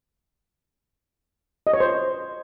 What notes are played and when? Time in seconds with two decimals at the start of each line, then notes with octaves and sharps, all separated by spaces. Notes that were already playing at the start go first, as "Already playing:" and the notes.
1.67 D#5
1.73 C#5
1.80 C5